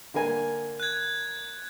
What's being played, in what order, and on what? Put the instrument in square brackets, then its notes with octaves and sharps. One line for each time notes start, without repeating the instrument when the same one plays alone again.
[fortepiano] D3 A#3 G#5
[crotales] F#6 G#6